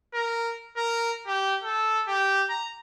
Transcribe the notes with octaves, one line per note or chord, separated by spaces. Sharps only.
A#4
A#4
G4
A4
G4
A#5